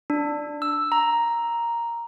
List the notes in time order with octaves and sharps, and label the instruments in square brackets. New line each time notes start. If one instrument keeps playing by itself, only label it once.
[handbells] D4
E6
A#5